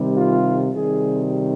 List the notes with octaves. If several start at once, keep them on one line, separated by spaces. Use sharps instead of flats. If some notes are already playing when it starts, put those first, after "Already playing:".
Already playing: C3 D#3 G3
F4
C3 D#3 G3 G#4